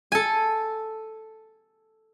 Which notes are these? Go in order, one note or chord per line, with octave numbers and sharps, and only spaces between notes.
A4 G#5